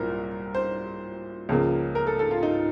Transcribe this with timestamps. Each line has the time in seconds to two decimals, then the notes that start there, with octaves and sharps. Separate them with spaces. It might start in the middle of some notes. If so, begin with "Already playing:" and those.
Already playing: C2 A#2 F#3 C4 A#4
0.55 C5
1.49 C#2 C#3 F3 A#3
1.95 A#4
2.07 A4
2.19 A4
2.31 F4
2.43 D#4